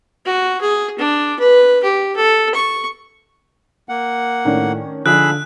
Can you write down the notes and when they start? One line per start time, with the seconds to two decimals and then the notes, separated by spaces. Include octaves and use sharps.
0.26 F#4
0.61 G#4
0.99 D4
1.40 B4
1.83 G4
2.16 A4
2.54 C#6
3.89 A#3 F#5
4.45 A2 D#3 C#4 D4
5.06 D3 F3 D#4 G#4 B5 E6 F#6